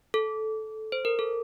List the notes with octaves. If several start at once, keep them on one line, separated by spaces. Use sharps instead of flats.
A4
C5
A#4
A4